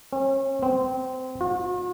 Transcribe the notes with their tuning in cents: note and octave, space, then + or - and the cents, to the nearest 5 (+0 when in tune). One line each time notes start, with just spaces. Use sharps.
C#4 -40
C4 -20
F#4 -45